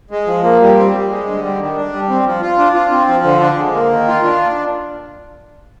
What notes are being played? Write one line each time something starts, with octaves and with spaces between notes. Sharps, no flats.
G#3
F3
A#3
G3
C4
G3
G#3
D3
G3
D#3
D4
G3
C4
F3
F4
D4
F4
C4
F3
D3
D4
G#3
A#3
D#3
F4
D4